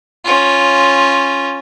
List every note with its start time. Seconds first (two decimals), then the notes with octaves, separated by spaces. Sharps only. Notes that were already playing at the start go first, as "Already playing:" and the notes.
0.24 C#4 F4